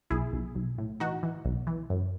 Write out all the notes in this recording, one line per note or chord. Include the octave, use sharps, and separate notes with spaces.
B1 E4 G#4
B1
B1
A2
E3 D#4 F#4
E3
B1
E3
F#2